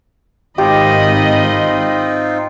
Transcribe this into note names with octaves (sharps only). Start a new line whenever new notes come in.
G#1 C4 D#4 F4 G4 D#5 B5